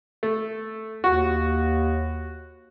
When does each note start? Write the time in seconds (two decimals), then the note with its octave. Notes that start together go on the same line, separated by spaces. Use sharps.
0.23 A3
1.04 D#2 F#4